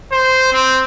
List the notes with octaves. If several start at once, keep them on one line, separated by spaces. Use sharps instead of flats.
C5
C4